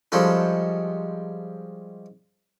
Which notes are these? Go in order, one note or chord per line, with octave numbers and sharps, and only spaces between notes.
F3 G3 G#3 C#4 A4